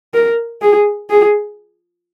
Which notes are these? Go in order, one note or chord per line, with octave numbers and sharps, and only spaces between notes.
A#4
G#4
G#4